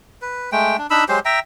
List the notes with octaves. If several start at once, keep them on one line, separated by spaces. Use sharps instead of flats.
B4
G#3 A3 G5
D4
D4 D#4 B5 E6
F#3 G#3 G4 C5
E5 G5 A#5